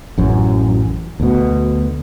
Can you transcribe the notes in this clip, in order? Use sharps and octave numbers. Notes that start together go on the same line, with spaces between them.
A1 F#2
D2 B2